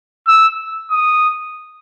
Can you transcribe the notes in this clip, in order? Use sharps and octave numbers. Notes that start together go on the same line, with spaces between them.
E6
D#6